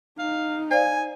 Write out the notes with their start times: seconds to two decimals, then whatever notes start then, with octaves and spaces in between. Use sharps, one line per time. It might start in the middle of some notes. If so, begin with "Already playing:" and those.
0.19 D#4 F5
0.71 C5 D5 F5 G#5